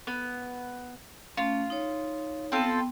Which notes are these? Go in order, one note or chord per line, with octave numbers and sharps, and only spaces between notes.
B3
A3 C#4 F4
D#4 C#5
B3 C4 F4 A4 G5 C6